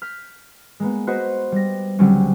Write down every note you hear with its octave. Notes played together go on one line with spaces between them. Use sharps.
F6 G6 B6
G#3 A#3 B3
F#4 B4 C5 D#5
G3 A#6
C#2 D3 F#3 G3 C4 C#4